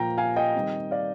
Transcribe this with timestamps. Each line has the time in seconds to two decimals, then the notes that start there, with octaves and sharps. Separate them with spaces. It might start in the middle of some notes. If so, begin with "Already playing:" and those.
Already playing: A#2 F3 A#3 G5 A#5
0.18 F5 G#5
0.36 D#5 G5
0.55 D#3 G3 C4
0.91 D5 F5